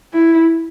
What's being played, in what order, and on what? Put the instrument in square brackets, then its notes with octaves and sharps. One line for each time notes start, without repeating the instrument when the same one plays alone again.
[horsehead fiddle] E4